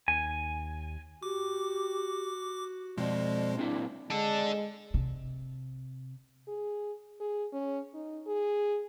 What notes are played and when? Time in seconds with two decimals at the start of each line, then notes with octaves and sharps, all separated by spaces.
0.08 D#2 G#5
1.23 F#4 G4 D6
2.98 F2 B2 G#3 C4 D5
3.56 A#2 C4 D4 E4
4.10 G#3 D4 A4
4.94 C3
6.48 G#4
7.20 G#4
7.52 C#4
7.94 D#4
8.27 G#4